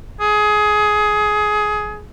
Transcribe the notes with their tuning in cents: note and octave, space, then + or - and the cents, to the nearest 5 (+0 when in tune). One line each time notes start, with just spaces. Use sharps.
G#4 +20